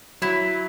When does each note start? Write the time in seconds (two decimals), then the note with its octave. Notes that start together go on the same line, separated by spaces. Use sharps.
0.22 F#3 E4